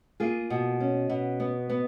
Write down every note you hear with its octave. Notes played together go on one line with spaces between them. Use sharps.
A#3 F4 G#4
B2
C#4
B2
B3
B3